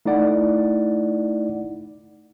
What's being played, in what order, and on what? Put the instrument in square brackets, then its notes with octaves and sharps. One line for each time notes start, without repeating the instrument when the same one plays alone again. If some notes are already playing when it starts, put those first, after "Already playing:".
[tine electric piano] A3 D#4 E4 D5 F#5